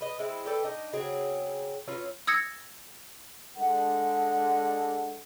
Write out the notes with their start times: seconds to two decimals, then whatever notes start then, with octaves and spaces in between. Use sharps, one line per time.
0.01 B4 D#5
0.19 G#3 C4 E4
0.46 A4 B4 D5 G5
0.63 D4 D#4 D#5
0.93 C#3 F#3 C4 G#4
1.88 F#3 C#4 F4 B4
2.27 D#6 E6 G#6 A#6 C#7
3.58 G#3 D4 A4 F#5